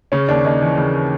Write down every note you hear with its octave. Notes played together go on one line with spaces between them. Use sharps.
C#3 C#4
D#2 D4
D#2 D#4
E3
C#3